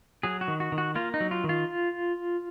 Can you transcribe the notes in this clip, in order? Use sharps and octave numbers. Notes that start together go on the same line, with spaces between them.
F#3 G#4
F#4
D#3
F#4
D#3
F#4
A#3 F4
D#4
F#3
F4
D#3
F4